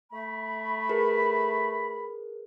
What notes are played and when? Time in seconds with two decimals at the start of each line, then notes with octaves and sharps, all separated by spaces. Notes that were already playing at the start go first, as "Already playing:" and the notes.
0.12 A3 B5
0.89 G#4 A#4 B4